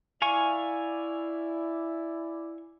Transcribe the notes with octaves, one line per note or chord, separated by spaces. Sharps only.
E4 D5 F5 G#5 C#6